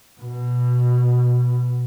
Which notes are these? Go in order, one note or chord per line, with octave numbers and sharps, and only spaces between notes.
B2